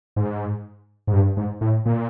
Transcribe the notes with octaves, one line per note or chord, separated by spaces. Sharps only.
G#2
G#2
G2
G#2
A2
A#2